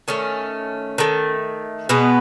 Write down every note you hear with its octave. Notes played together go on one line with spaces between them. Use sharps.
D#3 A3 C#4
D#3 A3
B2 G#3 B3